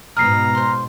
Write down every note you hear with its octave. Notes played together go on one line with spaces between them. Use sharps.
G#2 B2 D#5 A#5 B5 F6 C7
C5 C6